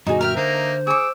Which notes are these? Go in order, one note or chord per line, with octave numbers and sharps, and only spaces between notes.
F#2 A#2 D3 D#4 F#4 G#4
A#4 E5 G5 F6
D3 A#3 D#4 C5
G#4 C#6 D6 E6